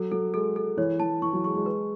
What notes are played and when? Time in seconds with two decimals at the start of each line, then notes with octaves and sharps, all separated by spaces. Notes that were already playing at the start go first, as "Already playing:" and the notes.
Already playing: F#3 A4
0.11 F#3 A4
0.34 G#3 A4
0.56 A4
0.77 E3 C#5
1.00 E3 A5
1.22 E3 C#6
1.33 F#3
1.44 G#3 C#6
1.55 G#3
1.66 B4